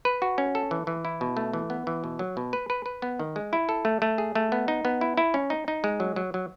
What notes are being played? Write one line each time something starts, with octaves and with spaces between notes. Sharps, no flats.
B4
F#4
C#4
A4
E3
E3
E4
B2
A3
E3
B3
E3
B2
F#3
B2
B4
B4
B4
B3
D#3
G#3
E4
A4
A3
A3
G#4
A3
B3
D#4
B3
E4
E4
C#4
D#4
D#4
G#3
F#3
F#3
F#3